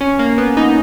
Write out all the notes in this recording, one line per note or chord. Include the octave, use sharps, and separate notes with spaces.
C#4
A#3
B3
D#4